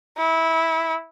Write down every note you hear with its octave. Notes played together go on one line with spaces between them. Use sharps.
E4